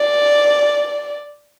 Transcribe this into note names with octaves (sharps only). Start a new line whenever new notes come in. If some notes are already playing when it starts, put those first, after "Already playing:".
Already playing: D5